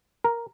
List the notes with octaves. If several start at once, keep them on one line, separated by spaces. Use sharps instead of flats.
A#4